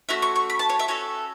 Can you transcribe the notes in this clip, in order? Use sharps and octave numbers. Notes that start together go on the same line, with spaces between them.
A3 C#4 F#4 E5
C#6
C#6
B5
A5
C#5
E5
C#4 F#4 A4 C#5